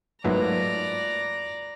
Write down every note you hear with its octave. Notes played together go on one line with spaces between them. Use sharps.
G#2 F#3 A3 A#3 F4 B4 D5 A#5